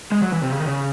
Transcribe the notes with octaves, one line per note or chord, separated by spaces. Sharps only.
G#3
F#3
E3
C3
C#3
D#3
C#3